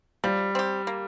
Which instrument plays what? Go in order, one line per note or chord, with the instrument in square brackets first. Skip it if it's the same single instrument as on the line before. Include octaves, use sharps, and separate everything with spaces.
[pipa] F3 [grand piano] G3
[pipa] C4 G4
A#3